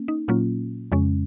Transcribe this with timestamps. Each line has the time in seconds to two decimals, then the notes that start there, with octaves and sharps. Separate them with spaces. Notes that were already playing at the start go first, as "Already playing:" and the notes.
Already playing: A#3 C#4
0.08 D#4
0.28 A#2 F#3 A#3 C#4 F4
0.92 F2 C#3 G#3 C#4